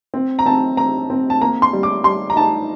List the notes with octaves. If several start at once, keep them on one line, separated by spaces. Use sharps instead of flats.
C4
A#5
C4 A5
C4 A#5
C4
A5
A#3 A#5
C6
G3
D6
G3 C6
A#5
D#4 A5